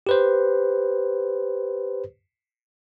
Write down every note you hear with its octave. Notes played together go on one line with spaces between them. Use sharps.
G4 B4 C5